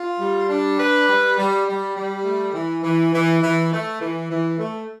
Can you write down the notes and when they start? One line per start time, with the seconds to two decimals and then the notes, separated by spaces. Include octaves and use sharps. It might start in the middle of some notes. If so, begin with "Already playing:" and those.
Already playing: F4
0.20 G3
0.49 D4
0.79 B4
1.08 G3
1.38 G3
1.67 G3
1.96 G3
2.25 A3
2.54 E3
2.83 E3
3.13 E3
3.42 E3
3.72 A3
4.01 E3
4.30 E3
4.59 A3